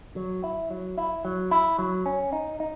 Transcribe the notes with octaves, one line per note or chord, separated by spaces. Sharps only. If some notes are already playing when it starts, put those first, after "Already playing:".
F#3
E4
F#3
E4
F#3
E4
F#3
C#4
D#4
D#4